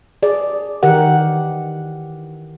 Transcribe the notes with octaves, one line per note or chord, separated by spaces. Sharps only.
G#4 D5
D#3 E3 G4 A#4 F#5